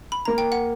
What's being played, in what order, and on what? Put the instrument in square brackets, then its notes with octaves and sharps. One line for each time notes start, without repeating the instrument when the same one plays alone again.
[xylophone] B5
[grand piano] A#3 [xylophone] A#5
[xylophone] G5
F#5